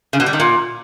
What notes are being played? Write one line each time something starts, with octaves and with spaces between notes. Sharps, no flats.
C#3
B2
G3
D#3
A#2